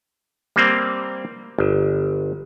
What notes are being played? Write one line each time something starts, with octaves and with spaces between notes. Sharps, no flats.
G3 A#3 C4
G1